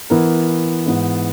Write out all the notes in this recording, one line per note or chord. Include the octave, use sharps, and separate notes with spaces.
E3 B3 E4 A#4
G#2 E3 B3 E4